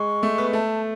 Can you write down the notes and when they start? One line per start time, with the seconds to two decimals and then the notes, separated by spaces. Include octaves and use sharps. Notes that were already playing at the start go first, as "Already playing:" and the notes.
Already playing: G#3 C#6
0.23 A3
0.38 B3
0.53 A3 A5